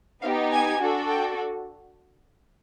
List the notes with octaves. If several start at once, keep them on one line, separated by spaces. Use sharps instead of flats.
B3 D#4 G4 F5
G#5
D4 F#4 A4
G5